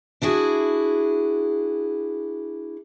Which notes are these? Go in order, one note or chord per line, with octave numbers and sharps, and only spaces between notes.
D4 E4 F#4 G#4